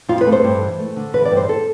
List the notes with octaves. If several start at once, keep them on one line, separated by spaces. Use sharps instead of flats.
F2 F4
B4
A3
C5
G2
E3
A3
D3
E3 B4
D5
G2
C5
A4